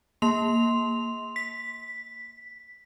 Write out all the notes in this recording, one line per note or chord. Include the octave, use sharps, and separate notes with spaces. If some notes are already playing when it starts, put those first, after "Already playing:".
A#3 C6 F7
B6